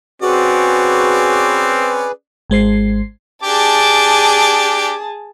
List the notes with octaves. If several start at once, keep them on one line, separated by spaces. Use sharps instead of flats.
C4 C#4 F#4 G#4 B4 D5
G#1 G#3 C5 C7
D4 G4 G#4 A5 D6